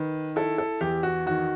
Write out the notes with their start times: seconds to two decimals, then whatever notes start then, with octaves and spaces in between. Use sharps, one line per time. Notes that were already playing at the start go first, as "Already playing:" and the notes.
Already playing: D#3 B4
0.36 E4 A4
0.58 A4
0.81 E2 G4
1.03 F#4
1.26 D#3 F#4